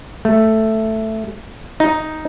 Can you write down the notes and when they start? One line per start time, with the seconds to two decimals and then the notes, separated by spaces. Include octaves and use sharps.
0.25 A3
1.80 D#4